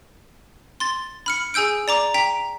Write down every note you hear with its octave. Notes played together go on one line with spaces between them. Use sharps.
C6 A6
B5 F6 C#7
G#4 G#5 E6 G6 D7
D5 A#5 D6
G5 A#5 B6